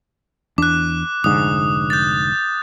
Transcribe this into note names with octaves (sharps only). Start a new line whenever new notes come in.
E2 D4 D6 F#6
F1 G#2 D3 D#6
G6 A6